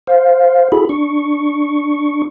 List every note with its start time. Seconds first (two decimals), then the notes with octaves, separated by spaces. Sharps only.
0.07 C5 F5
0.72 E4 F#4 G#4 A4 B5
0.89 D4 C#6